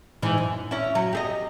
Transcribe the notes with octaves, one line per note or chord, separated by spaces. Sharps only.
G#2 D#3 E3
F#2
C#4 E4
F#3
G4 G#4 D#5